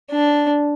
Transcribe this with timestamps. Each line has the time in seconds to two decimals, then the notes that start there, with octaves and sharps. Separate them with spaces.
0.11 D4